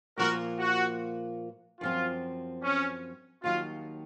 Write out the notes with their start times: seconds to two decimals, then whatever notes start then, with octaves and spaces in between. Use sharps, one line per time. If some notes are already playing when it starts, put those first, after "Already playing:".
0.17 A#2 F3 A#3 F4 F#4 A#4
0.59 F#4
1.80 F#2 F3 C4 F4
2.63 C#4
3.44 D#2 D#3 F#3 F4